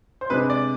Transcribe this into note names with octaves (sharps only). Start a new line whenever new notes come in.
C5
C3 G#3 D4 B4
D5